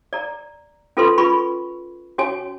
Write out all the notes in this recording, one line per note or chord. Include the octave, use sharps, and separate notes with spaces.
D5 A#5
C#4 F4 A4 B4 C5 C6
C#4 F4 G#4 B4 B5 C#6
C#4 F#4 C#5 G#5